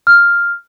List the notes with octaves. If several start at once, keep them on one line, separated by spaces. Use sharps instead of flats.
F6